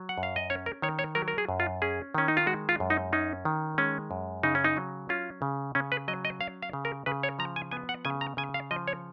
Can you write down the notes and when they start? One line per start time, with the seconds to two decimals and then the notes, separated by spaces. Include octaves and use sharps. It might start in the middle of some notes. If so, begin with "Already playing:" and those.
Already playing: F#3
0.09 F#5
0.18 F#2
0.23 F5
0.36 D#5
0.50 C#4 C#5
0.66 A#4
0.82 D#3 C#5
0.99 C#5
1.15 F#3 A#4
1.28 A#4
1.38 G#4
1.49 F#2
1.60 F4
1.82 C#4 G#4
2.15 D#3 C#4
2.28 D#4
2.37 F4
2.46 G#3 F#4
2.69 F4
2.80 F#2
2.90 D#4
3.13 C#4 D#4
3.45 D#3
3.78 G#3 C#4
4.11 F#2
4.43 C#3 D#4
4.55 C#4
4.64 D#4
4.77 F#3
5.09 C#4 F4
5.42 C#3
5.75 C#3 C#4
5.92 B4
6.08 F#3 D#5
6.25 D#5
6.40 C#4 F5
6.62 F5
6.73 C#3
6.85 A#4
7.06 C#3 B4
7.23 C#5
7.39 F3 A#5
7.56 G#5
7.71 B3 G#5
7.89 F#5
8.05 C#3 G#5
8.21 A#5
8.37 C#3 G#5
8.54 F5
8.71 F3 D#5
8.88 C#5